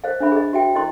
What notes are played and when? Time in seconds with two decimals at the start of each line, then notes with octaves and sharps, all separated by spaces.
0.04 C5 D#5 F5
0.20 D4 C5 E5 B5
0.32 G#4 D#5
0.53 F#4 E5 G5
0.75 E4 D#5 C6